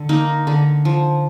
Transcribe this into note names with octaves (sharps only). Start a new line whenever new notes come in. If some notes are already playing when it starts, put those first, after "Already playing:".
Already playing: D3
A#3 D#4
D3
F3